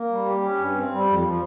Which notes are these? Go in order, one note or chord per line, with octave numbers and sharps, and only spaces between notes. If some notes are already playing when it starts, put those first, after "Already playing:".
Already playing: A#3
G3
G4
C#4
G2
C4
G3
F2
F3